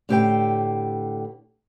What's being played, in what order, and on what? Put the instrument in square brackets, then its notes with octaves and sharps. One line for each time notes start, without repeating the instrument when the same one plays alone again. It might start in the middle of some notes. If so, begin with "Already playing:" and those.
[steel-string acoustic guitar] A2 D3 G4 B4 C5 G5